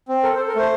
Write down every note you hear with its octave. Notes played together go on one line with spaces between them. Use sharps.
C4
A4 A#4
C5
A4
A#4
A3 C5